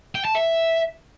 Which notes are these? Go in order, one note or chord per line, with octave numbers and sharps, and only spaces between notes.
G5
A5
E5